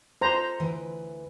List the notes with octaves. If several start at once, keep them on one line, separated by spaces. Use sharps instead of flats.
A4 C5 A#5
D2 E3 B4